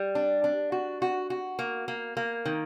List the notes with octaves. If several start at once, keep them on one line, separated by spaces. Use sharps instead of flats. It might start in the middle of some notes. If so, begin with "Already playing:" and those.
Already playing: G3
D4
D4
F#4
F#4
F#4
A#3
A#3
A#3
D#3